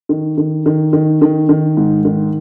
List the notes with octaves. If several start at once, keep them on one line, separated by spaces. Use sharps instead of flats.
D#3
D#3
D#3
D#3
D#3
D#3
G#2
D#3